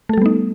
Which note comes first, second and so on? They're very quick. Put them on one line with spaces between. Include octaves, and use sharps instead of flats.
A3 A4 G3 B3 D#4